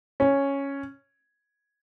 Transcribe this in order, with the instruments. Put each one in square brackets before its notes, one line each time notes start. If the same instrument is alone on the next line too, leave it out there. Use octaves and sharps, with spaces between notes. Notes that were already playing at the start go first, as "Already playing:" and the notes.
[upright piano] C#4